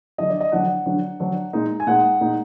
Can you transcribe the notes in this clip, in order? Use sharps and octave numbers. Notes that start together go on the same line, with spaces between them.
D3 F#3 D4 D#5
D5
D#5
D3 F#3 D4 F#5
D3 F#3 D4
D3 F#3 D4
A#2 G#3 D#4
G#5
A#2 G#3 D#4 F#5
A#2 G#3 D#4